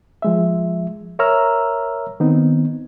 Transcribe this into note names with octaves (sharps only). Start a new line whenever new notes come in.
F3 G#3 E5
A#4 C#5 E5 A#5 E6 F6
D#3 B3 C4 D#4